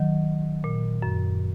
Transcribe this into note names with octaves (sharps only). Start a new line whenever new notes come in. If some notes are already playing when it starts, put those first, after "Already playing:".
Already playing: D#3 F#3
A#2
F#2